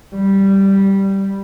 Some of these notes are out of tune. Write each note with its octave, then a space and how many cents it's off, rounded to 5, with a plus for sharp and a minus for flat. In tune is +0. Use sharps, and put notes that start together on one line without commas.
G3 -5